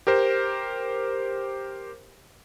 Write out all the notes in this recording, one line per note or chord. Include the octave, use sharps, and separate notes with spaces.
G4 A#4 C5